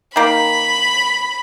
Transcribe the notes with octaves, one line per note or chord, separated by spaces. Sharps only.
D#3 A#3 B5